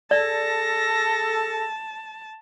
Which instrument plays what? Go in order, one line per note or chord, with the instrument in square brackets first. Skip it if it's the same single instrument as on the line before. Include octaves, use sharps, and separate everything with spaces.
[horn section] G#4 A4 [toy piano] D5 [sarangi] A5 [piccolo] A#6